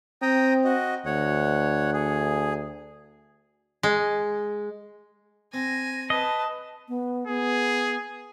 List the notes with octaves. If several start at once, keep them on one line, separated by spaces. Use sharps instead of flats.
C4 G5 A#5 D#6
F#4 D#5
D2 C#5 F#5
G#4
G#3
C4 G#5 A#6
B4 D#5 A5
B3
B3 G#4